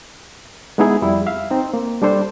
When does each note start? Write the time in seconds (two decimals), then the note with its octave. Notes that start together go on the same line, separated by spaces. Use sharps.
0.78 G#3 B3 D#4 E4 G#4
1.02 F2 G3 E4
1.26 E5 F5
1.50 C4 D#4
1.74 A#3
2.02 G3 D4 A4 C5